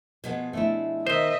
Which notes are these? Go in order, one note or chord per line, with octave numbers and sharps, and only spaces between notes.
B2 F3 G#3 B3 G#4
A3 D4 E4
B2 D#3 C5 D#5 E5